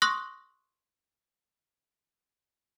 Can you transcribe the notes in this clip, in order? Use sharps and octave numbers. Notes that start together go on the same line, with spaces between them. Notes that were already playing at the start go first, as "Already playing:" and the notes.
C6 C#6 D#6 E6 F#6 A#6